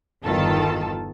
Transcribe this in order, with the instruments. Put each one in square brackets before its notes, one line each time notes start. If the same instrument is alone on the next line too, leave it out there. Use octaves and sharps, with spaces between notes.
[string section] G1 E2 D#3 F4 A4 A5